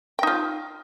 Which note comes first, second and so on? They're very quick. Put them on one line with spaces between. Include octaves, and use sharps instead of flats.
G5 D#4 F4